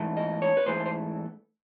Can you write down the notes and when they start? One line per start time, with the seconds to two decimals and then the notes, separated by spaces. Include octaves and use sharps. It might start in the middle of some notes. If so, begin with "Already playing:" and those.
Already playing: G#2 E3 A3
0.17 D#5
0.42 C#5
0.57 B4
0.66 G#2 E3 A3 C5
0.86 C5